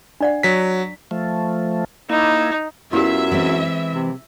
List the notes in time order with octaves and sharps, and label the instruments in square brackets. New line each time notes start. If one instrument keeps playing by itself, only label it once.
[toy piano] D4 D5 F#5
[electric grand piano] F#3 B6
[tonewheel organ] F3 A3
[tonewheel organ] A#3 E4 [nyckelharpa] D#4
[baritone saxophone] F#2 [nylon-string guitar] B3 F4 [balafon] E4 G4 [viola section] E5
[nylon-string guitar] E3 G#3 C4
[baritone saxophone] C3